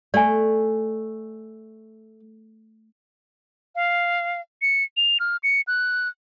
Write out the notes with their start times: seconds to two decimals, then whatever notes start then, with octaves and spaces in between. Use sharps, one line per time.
0.14 A3 D5 G#5
3.75 F5
4.62 C#7
4.97 F7
5.20 F6
5.43 C#7
5.67 F#6